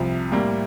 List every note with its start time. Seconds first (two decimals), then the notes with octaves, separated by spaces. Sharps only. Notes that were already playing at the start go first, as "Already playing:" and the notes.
Already playing: C2 C3 F3
0.32 A2 G3 A#3